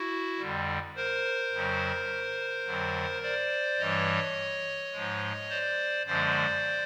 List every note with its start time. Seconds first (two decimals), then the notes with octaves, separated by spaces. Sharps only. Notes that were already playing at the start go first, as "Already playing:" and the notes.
Already playing: E4 F#4
0.39 F2 D3 G3
0.96 A#4 C5
1.53 F2 C#3 F#3
2.66 F2 D3 F#3
3.22 C5 D5
3.79 G2 E3 G3 C#5 D#5
4.93 G#2 F3 G#3
5.49 C5 D5
6.06 F#2 D3 F3 G#3 C5 D5